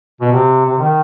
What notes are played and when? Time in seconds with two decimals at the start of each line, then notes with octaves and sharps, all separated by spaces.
0.21 B2
0.32 C3
0.66 C3
0.78 D#3